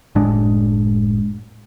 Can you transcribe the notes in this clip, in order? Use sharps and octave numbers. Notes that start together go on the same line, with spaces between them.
F#1 A2 G#3 D4